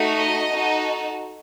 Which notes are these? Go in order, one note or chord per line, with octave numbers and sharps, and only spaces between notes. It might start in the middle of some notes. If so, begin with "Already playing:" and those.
Already playing: A3 D#4 F#4
D#5
D#4 F#4 A4